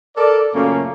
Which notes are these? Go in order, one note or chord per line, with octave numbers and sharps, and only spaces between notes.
A4 A#4 D5
F#2 A#2 C#3 A3 A#3 C#4